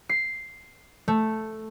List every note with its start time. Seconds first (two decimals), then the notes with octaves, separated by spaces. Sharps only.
0.09 C7
1.08 A3